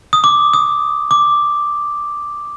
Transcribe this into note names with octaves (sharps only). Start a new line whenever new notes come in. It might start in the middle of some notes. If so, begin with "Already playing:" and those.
D#6
D6
D#6
D6